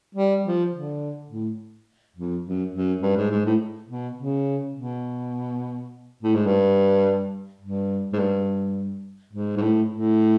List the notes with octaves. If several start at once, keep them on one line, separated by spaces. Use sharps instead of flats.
G3
F3
D3
A2
F2
F#2
F#2
G2
G#2
G#2
A2
B2
C#3
B2
A2
G#2
G2
G2
G#2
G2
G#2
G#2
A2
A2